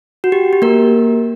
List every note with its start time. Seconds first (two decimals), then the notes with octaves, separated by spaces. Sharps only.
0.24 F#4
0.32 G4
0.53 G4
0.62 A#3 A#4